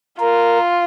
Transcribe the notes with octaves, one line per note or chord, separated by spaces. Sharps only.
F4 A#4